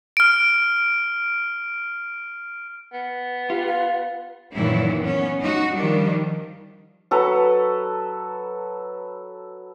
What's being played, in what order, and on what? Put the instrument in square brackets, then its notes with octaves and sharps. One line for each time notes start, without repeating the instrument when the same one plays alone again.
[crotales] F6 D7
[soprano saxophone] B3
[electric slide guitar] F4 [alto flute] G4
[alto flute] F5
[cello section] F#2 A#2 D#3 E3 F#3 E4
B3 C#4
D#4 F#4
D#3 F3 G3 D4
[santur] F#3 A4 B4 A#5